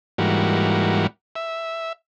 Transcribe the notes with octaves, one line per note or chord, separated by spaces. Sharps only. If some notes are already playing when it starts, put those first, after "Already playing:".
G#2 E3 G3 A#3 F#4
E5